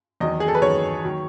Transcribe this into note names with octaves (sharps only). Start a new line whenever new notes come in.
E2 D#3 F#3 D#5
G#4
A4
B4
E2 D#3 F#3 C#5
D#3 F#3